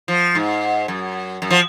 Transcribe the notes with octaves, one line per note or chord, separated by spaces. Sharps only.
F3
G#2
F#2
F#2
F3